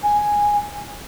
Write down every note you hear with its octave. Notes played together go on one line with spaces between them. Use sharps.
G#5